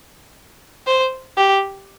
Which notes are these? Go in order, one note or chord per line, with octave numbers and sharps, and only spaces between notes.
C5
G4